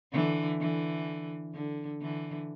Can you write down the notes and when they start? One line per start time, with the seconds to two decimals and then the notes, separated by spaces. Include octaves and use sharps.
0.12 D3 E3
0.60 D3 E3
1.54 D3
2.01 D3 E3